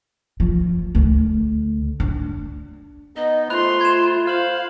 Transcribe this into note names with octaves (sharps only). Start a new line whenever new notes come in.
F3
D2
D4
B3 D#4 D#5
A3 F4 C5 B5 C6 F#6 F7
G#6 E7
C5 F5 F6 E7 F#7